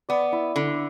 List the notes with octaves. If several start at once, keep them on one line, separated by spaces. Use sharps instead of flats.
B3 D5
E4
D3 E4